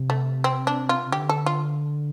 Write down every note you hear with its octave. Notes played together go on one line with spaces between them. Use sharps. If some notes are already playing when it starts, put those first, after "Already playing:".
Already playing: C3
A3
C4
D4
F4
C3
D3 G4
A4
F4